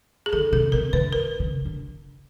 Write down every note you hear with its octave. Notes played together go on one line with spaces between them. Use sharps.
G#4
D3 A4
C3 A4
C3 A#4
D3 B4
A#4
C#3
D3